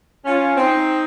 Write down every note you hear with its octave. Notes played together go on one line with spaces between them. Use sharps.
C#4 F4
C4 D#4